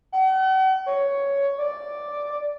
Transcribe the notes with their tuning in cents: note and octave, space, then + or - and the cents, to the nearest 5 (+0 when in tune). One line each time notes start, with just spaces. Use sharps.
F#5 +45
C#5 +10
D5 +0